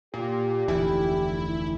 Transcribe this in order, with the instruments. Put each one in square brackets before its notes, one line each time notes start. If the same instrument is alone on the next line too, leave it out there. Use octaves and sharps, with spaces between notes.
[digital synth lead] A#2 [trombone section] G4
[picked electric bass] F1 D2 E3 [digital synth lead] E4